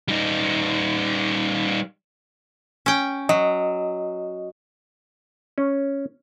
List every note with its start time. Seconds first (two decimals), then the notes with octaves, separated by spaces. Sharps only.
0.08 G3 D#4
2.86 C#4 G5
3.29 F#3 D#5
5.58 C#4